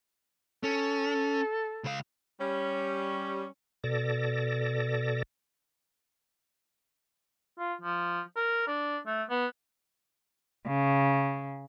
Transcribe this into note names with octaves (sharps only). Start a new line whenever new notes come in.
C#4 A4
C#2 F5
G3 C#4
B2 A4 D5 A#6
F4
F3
A#4
D4
A3
B3
C#3